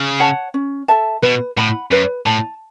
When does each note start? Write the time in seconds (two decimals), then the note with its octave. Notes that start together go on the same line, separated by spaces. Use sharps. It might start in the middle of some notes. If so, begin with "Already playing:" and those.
Already playing: C#3
0.20 C#5 F#5 A5
0.54 C#4
0.88 A4 E5 A5
1.22 B2 B4
1.57 A2 F#5 B5
1.91 F#2 B4
2.25 A2 A5